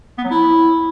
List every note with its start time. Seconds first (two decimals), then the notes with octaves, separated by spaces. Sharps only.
0.18 B3
0.24 F#3
0.31 E4